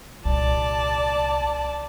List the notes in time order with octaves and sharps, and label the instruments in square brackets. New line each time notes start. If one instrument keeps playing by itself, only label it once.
[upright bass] C2 A#2 [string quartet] D5 A5